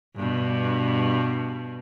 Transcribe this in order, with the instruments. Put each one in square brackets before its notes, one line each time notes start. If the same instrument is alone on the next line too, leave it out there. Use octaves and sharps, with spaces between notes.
[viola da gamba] G2 B2